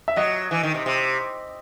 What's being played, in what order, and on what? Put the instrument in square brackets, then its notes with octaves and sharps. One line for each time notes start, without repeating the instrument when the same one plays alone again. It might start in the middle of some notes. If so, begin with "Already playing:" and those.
[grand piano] E5
[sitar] F#3 [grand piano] D#5
[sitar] E3
D#3
C3
C3